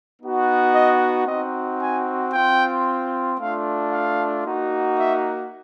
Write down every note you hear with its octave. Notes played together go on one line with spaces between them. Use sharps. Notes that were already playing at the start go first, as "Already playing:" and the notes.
B3 D#4 F#4
D#5
C4 D#4 F#4 D#5
G#5
C4 F4 G5
A3 D4 F4 F5
F5
A#3 D#4 F#4
E5